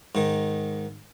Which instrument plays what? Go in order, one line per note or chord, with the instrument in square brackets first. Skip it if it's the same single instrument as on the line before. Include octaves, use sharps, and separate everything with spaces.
[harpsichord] G#2 D#3